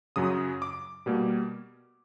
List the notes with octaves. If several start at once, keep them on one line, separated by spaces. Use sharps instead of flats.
F#2 C#3 F#3 D#6
D6
B2 G3 A#3